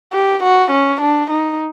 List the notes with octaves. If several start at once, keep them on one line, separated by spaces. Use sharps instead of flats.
G4
F#4
C#4
D4
D#4